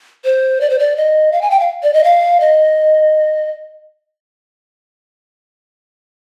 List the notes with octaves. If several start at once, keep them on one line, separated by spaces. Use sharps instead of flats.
C5
D5
C5
D5
D#5
F5
G#5
G5
F5
D5
D#5
F5
D#5